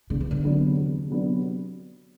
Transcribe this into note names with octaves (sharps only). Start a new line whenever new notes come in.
E2 D3
E3
D3
C3 F#3 B3 D4
E2
C3 F#3 B3 D4